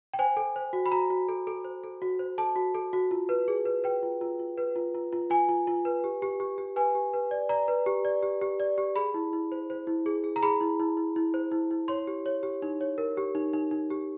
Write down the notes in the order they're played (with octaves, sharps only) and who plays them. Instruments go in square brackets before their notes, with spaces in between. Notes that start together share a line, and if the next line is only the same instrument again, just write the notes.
[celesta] G5
C5 G#5
A4
C5
F#4
B5
F#4 A#5
F#4
A4
A4
C5
A4
F#4
C5
A4 A5
F#4
A4
F#4
F4
B4
G#4
B4
B4 G5
F4
F4
F4
B4
F4
F4
F4
F4 G#5
F4
F4
B4
G4
G4
G4
G4
B4 G#5
G4
B4
D5
D5 A#5
B4
G4
D5
G4
G4
D5
G4
G#4 B5
E4
E4
C5
C5
E4
G#4
G#4
A#5
G#4 B5
E4
E4
E4
E4
C5
E4
E4
C#5 C6
G4
C#5
G4
D#4
C#5
A#4
G4
D#4
D#4
D#4
G4